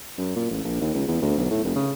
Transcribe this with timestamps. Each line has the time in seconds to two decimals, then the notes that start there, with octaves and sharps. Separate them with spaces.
0.18 F#2
0.36 A#2
0.50 A1
0.64 A#1
0.81 D#2
0.94 C#2
1.08 E2
1.22 D2
1.38 B1
1.51 A2
1.64 F1
1.76 C#3